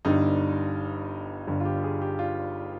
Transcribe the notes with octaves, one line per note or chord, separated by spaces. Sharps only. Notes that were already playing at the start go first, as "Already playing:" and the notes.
G1 G2 D3 G3 D#4
G1 G2 D3
F4
G4
G#4
G4
F4